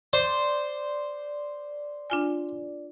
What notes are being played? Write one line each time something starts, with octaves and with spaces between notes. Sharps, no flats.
C5 D5
D4 F4 G#5